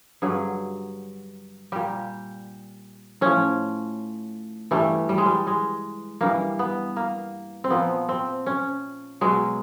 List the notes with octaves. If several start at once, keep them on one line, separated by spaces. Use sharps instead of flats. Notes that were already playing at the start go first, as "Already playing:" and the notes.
G2 D3 F#3 G#4
A#2 G3 G4
A2 F3 C#4
G2 E3 G3 A3
G3
G#3
G3
G#3
G2 E3 G3 A#3
B3
A#3
C4
A#2 F3 B3
C4
C#4
B2 F#3 G#3